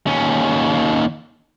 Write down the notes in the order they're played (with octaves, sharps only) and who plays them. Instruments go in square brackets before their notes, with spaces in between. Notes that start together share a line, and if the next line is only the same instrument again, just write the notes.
[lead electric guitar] D#2 C#4